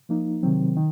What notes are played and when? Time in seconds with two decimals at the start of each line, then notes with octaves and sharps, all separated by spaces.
0.09 F3 A#3 D#4
0.43 C3 D#3 F#3 C4
0.77 D#3